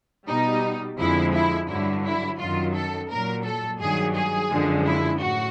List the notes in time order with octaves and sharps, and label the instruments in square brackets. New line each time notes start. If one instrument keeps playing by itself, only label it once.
[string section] B2 G3 D#4
F2 D3 F3 G#3 E4
E4
G2 D3 F#3 E4
E4
F#2 D#3 F#3 F4
A4
A#2 F#3 A#4
A4
G2 D#3 F#3 G#4
G#4
F#2 D3 F3 G#3
E4
A2 F#4